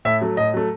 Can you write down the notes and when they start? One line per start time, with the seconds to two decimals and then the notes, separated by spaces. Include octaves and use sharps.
0.05 A2 E5
0.21 F#3 A3
0.37 A2 D#5
0.54 F#3 A3